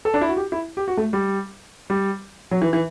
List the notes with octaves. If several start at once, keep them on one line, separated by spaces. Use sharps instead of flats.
A4
D4
E4
F#4
G4
E4
G4
F#4
A3
G3
G3
F#3
E3
E3